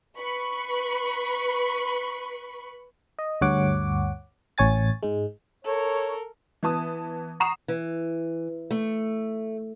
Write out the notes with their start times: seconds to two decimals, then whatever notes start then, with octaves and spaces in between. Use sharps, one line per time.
0.17 B4 B5 C#6
3.19 D#5
3.41 D2 G2 C#5 F#5 D6
4.58 A1 C#5 G#5 A6
5.03 G#2 G#3
5.65 A4 A#4 C#5
6.63 E3 B3 A5 D#6
7.40 F#5 A#5 C#6 D#6 C7 E7
7.68 E3
8.71 A3